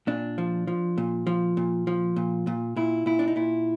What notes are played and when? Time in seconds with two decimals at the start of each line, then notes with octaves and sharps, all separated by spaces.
0.07 A#2 D4
0.38 F3
0.67 F3
0.98 A#2
1.27 F3
1.57 A#2
1.87 F3
2.16 A#2
2.47 A#2
2.76 A#2 E4
3.06 A#2 E4
3.19 D4
3.28 D#4
3.36 A#2 E4